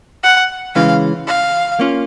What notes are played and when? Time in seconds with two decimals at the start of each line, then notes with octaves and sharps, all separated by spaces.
0.23 F#5
0.75 C#3 E3 G#3 C#4 F5
1.27 F5
1.79 A#3 C#4 F4